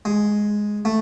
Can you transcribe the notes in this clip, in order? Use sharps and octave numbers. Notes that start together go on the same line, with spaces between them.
G#3
A3